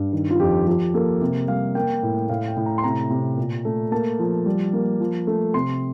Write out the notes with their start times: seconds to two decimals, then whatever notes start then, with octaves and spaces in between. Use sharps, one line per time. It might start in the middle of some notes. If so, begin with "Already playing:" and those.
Already playing: G2
0.13 D#3
0.31 F4
0.40 F2 G4
0.67 F3 G4
0.94 A#3 A4
1.21 C3
1.48 G3 F5
1.75 A#3 G5
2.03 A2
2.29 A2 F5
2.48 G5
2.57 A2
2.66 A#5
2.78 C6
2.84 C3 A#5
3.10 C3
3.38 A#2
3.65 A3
3.91 A#3 A5
4.19 F3
4.46 G3
4.73 A#3
5.00 F3
5.27 A3
5.54 C3 C6